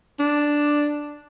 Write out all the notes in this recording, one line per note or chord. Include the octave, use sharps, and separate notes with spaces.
D4